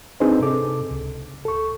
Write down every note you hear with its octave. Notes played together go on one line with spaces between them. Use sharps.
C4 D4 D#4 G#4 B4 C5
C3 A4 D6
C#2
A4 C#6